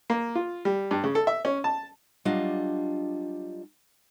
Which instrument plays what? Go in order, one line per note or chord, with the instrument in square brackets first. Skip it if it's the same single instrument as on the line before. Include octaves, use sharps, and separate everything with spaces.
[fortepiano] A#3
F4
G3
G2
C#3
A4
E5
C#4
A5
[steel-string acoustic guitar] F#3 G3 D4 F4 D#5